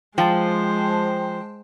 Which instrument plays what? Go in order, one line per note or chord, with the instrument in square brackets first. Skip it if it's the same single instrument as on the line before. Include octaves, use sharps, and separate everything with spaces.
[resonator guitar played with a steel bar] F3 [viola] G#3 C5 [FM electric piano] G5 A5